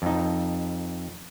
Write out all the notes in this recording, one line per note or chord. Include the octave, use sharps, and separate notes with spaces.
F2 D#4